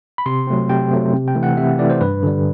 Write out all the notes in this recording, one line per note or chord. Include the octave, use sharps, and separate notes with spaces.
B5
C3 C6
F#3 A3 C4
C3 G5
F#3 A3 C4
C3
G5
E3 A3
F#5
C3 E5
E3 A3 D5
C5
G2 B4
D3 G3